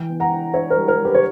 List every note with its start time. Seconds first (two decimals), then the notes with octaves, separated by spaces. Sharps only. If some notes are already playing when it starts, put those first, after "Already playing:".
Already playing: E3 G5
0.09 B3
0.20 F#5 A#5
0.31 D4
0.54 D4 C#5 E5
0.70 A#4 C#5
0.76 G3
0.88 A#4 C#5
0.99 G3
1.05 G4 B4
1.15 C#5